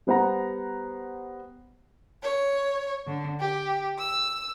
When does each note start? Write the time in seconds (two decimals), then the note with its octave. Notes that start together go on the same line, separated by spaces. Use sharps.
0.07 G3 B3 C5 F#5 A#5
2.23 C#5
3.07 D3
3.39 G4
3.98 E6